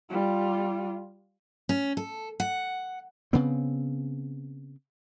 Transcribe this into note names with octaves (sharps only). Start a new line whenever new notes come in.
G3 F4
C#4
A4
F#5
C#3 B3 C4